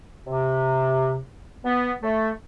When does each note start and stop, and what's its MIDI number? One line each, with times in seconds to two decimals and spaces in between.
0.26 1.18 48
1.65 1.92 59
2.02 2.30 57